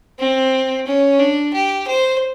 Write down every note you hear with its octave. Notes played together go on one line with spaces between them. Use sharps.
C4
C#4
D4
G4
C5